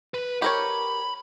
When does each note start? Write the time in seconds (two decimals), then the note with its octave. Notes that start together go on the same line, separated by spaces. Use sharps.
0.14 B4
0.42 G4 A#4 C#5 B5